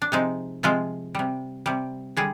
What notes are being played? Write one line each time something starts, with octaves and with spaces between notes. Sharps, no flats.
D4
C3 F3 G#3 D#4
C3 F3 G#3 F4
C3 G3
C3 G3
D3 G3 G#4